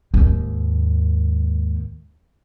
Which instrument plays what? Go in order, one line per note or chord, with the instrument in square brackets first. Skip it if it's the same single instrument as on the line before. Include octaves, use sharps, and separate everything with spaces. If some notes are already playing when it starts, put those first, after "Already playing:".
[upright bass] D#2 G#2